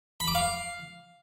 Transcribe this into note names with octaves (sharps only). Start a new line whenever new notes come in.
B5
D6
F5